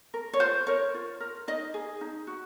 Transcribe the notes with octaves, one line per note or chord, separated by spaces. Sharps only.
A#4
C#5
F4 C5
A#4 C#5
F4
A#4
D#4 D#5
G#4
D#4
F#4